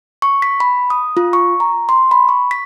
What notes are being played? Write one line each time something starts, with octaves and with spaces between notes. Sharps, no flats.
C#6
B6
B5
D#6
F4
C#6
A#5
C6
B5
C#6
B6